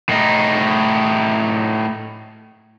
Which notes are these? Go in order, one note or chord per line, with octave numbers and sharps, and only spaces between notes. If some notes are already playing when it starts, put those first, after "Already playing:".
A2 D#4